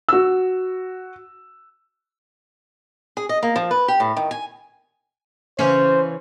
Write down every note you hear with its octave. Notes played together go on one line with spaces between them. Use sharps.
F#4 E6
G#4
D#5
A#3
F3
B4
G4
A2
D#3
G#5
C#3 E3 C#4 C5